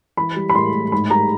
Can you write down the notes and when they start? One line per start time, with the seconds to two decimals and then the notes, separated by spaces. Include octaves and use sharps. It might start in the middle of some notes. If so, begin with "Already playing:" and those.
0.17 E3 B5
0.36 G3
0.50 B5
0.54 A2 C6
0.74 A2
0.92 G#2 B5
1.11 G3 A#5